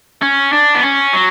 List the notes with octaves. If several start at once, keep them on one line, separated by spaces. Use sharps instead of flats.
C#4
D4
B3
C#4
F#3